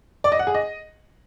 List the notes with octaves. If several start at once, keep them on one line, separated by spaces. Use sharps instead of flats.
D5
D#5
F#5
G#4
D#5